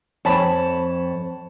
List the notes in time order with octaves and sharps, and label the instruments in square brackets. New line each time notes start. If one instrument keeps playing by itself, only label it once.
[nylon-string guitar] F2 [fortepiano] C#5 A5 B5